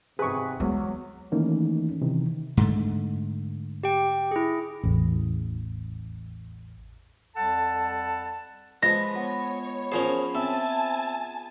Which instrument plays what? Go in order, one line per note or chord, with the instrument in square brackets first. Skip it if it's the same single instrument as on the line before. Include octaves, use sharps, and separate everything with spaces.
[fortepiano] G#1 B4 [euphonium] C3 [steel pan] G#4 C#6
[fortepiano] E2 [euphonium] F#3 [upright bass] G#3 B3
[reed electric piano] D#3 E3 A3 A#3 C#4 D#4
C3 D#3 E3
[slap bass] G#2 D3 A3
[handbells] G4 G5
E4 G#4
[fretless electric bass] A1 E2
[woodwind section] F2 G3 A4 F#5 A5
[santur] F3 B4 A5 [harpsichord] G#3 [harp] A#6
[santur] B3 [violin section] C#5
[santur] F3 G#4 [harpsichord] C#4 A#4 C5
[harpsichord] C4 [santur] E5 [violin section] G#5 A5